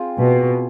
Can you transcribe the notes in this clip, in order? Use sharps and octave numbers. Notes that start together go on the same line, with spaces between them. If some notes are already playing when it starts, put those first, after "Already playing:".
Already playing: C4 F4 G#4
B2